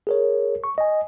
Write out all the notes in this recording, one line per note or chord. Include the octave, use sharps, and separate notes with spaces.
G#4 A#4 C#5
C#6
D#5 G#5